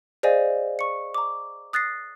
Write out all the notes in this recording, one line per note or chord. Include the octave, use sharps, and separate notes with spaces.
G#4 C5 D5 D#5 F5 G#5
C#6 C#7
A#5 D6
D#6 F#6 A6 A#6 C7